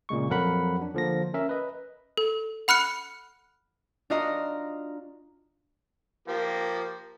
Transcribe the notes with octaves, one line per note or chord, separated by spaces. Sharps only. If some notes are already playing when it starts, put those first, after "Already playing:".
A#2 C#3 G#3 C#6
F2 F#3 A#4 F#5 B5
D4
D3 F3 A#3 A#6
C#4 A#4 E5
B4 D#5
A4
F#5 B5 F6 F#6 C#7
D4 F4 F#4 D#5 F5 A#5
F3 A#3 G4